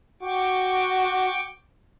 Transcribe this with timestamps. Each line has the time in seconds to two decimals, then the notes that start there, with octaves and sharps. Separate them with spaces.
0.22 F#4 G5 C#6 D6